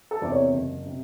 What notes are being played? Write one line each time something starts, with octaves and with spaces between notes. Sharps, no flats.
A4
E2 C3 D5
C#5
F#1
C3